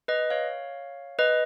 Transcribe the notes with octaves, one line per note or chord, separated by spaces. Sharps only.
B4 D#5
C#5 F5
B4 D#5